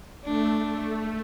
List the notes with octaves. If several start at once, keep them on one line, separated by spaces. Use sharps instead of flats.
A3 D4
A3